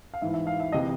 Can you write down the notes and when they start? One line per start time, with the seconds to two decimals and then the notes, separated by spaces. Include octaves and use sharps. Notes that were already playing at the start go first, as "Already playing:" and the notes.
0.14 F5
0.22 G#2 E3 E5
0.34 E5
0.47 F5
0.60 E5
0.72 C3 E3 D#5